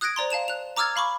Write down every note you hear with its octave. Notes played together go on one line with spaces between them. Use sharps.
D#6 F#6 G#6 A#6 D7
C5 D5 A#5 C6
F5 A5 E7 F7
F#6 F7
A#5 D6 E6 F6 G#6 A6
F5 B5 C#6 D6